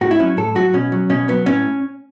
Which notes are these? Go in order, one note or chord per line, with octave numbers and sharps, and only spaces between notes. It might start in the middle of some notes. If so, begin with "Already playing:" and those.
A2 F#4
E4
F#3 C#4
A2 A4
F#3 F#4
B2 C#4
F#3
B2 C#4
F#3 B3
A2 C#4